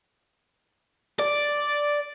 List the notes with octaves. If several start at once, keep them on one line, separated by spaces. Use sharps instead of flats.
D5